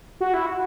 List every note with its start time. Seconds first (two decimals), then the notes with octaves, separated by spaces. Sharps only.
0.21 F#4
0.34 E4
0.46 F#4